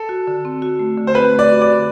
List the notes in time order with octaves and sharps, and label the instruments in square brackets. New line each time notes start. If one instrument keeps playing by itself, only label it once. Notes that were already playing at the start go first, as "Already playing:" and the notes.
Already playing: [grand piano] A4
[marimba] F#4
D3
C4
F#4
A3
D3
[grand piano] C5
[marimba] C4 [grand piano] B4
[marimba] A3
[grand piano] D5
[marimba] F#4
[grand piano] D5
[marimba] D3